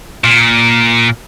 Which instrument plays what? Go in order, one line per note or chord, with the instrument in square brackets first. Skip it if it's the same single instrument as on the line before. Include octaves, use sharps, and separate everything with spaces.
[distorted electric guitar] A#2